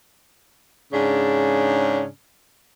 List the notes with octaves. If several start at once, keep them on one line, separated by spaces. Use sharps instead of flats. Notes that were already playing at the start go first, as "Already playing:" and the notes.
G#2 C#3 C#4 D4